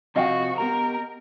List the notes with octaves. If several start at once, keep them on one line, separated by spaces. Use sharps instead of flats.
C3 F3 F#4 D#5 F5 G5 G#5
B3 G4 A#4 A#5